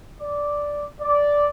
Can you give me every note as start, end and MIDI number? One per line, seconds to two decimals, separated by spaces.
0.21 0.85 74
1.01 1.48 74